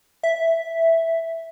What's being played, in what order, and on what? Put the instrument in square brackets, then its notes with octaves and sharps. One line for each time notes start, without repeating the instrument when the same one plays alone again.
[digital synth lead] E5